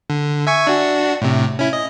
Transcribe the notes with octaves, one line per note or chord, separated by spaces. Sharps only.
D3
E5 G#5 C#6
D4 F#4
A2 C3
C#4 E4
D#5